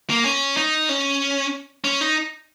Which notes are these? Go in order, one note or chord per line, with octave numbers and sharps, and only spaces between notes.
A#3
C#4
D#4
C#4
C#4
D#4